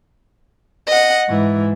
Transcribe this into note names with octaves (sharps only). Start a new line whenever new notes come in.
D#5 F#5
G#2 E3